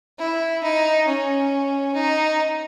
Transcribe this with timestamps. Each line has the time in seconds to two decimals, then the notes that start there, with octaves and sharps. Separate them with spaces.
0.19 E4
0.63 D#4
1.07 C#4
1.95 D#4